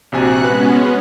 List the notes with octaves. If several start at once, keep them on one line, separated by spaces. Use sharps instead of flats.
A#1 C3 F#4 G#5 F#6
G#3 B3 C#4 B4